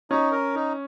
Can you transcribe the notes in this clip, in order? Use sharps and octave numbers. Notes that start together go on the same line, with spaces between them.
C#4 D#4
A#4
D#4